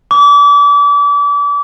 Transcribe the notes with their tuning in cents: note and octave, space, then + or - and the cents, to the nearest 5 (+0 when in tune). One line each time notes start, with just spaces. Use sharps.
D6 -35